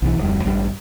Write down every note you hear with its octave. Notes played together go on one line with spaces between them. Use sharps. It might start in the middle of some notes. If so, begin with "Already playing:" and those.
B1 E3
D1 F2 G3
A1 G2 G3